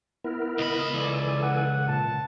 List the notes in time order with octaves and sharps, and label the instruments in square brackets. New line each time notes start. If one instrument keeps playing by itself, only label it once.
[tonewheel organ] B3 E4 A#4
[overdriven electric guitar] C#2 B5 [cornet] D#5
[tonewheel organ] E3 A4 G#5 [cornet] D5
[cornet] F#5
[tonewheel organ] A#2 [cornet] A5